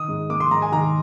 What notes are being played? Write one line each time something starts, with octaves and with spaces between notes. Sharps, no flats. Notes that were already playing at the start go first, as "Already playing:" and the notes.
Already playing: D#3 D#6
G#2
A#3 D6
C6
G#2 A#5
G#5
D#3 A#5